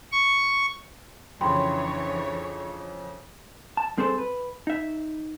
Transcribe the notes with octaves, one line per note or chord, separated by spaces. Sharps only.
C#6
F2 C#3 E3 D4 C#5 G5 B5 C6
A5
G2 C4 G#4 A4 C5
B4
D#4 E5